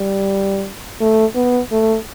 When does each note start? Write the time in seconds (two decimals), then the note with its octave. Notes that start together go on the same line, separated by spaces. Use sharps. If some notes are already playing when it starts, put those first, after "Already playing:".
Already playing: G3
1.00 A3
1.35 B3
1.72 A3